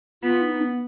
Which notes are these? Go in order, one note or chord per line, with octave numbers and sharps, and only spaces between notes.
B3 F4
D#4
B3